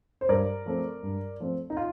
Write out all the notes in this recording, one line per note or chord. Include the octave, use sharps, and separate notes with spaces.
C5
G2 A#4 D5
F3 A3 C4
G2
F3 A3 C4
D#4
F4